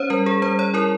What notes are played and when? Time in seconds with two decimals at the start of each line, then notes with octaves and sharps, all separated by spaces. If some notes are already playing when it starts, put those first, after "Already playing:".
Already playing: C#4 C5 C#5
0.10 G3 A#4
0.26 G#4
0.42 G3 C5
0.59 C#5
0.74 E4 A#4